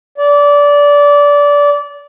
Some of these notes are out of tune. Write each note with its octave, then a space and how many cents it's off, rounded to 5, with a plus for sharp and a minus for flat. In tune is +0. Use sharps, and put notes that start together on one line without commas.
D5 -20